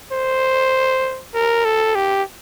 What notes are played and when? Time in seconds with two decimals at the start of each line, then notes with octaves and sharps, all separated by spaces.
0.12 C5
1.34 A#4
1.65 A4
1.95 G4